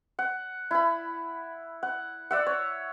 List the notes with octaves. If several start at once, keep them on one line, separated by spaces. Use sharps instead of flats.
F#5
E4 B5
F#5
D5 E5 F#5
C#5